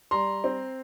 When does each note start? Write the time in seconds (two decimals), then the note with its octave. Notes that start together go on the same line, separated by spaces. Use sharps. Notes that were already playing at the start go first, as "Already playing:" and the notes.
0.11 G3 A#5 C6
0.44 C4